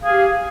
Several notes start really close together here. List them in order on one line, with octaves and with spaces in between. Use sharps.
F5 G#4 G4